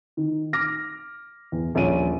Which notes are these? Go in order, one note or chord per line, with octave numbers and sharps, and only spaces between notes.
D#3
D6 F6 A#6
E2
D#1 A#1 C#5 D#7